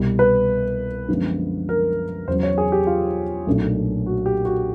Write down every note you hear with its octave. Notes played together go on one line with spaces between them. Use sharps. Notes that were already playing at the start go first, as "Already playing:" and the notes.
Already playing: C2 B2 G3
B4
F#2 D3 F3 G#3 B3
A#4
E2 C#3 F#3 C5
C#5
G#4
G4
F4
B1 A#2 F#3 A3 D4
F#4
G4
F#4